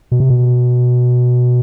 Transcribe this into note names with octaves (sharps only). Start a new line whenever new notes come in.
B2
C3
B2